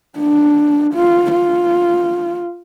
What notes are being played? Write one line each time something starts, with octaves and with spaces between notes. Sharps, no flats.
D4
F4
F4